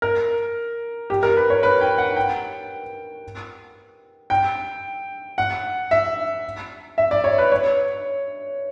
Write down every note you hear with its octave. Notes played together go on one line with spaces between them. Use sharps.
A#4
G4
A#4
B4
C#5
B4
G5
F#5
G5
G5
F#5
E5
E5
D5
C#5
B4
C#5